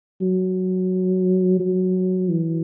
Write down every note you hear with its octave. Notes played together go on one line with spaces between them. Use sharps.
F#3
F#3
E3